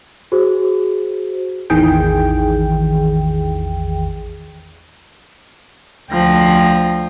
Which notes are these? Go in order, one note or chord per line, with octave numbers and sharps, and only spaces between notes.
F#4 G#4 C5
A1 E2 D#3 E3 G#4 G5
D2 F3 G5 A#6